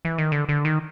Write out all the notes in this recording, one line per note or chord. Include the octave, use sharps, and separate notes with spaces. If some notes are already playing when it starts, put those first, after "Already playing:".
E3
D#3
D3
D3
D#3